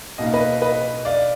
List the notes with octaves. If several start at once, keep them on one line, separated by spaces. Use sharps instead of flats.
B2 A#3 D#4 D#5
F5
B4 D#5
B4 D#5
D5 F5